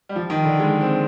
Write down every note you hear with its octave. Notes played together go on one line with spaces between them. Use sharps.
G3
F3
D#3
D3
G#3
C4